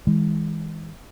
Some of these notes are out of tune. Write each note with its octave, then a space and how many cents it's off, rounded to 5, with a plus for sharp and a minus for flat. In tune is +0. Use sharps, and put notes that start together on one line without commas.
E3 -45 G#3 -20